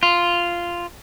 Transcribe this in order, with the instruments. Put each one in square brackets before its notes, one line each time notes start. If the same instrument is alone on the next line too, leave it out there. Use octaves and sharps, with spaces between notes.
[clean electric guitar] F4